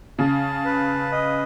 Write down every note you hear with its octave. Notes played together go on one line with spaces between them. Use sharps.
C#3 A5
B4
D#5